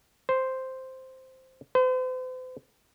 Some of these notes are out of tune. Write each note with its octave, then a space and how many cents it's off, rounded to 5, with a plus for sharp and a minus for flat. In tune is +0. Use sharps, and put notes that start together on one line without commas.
C5 +0
C5 -40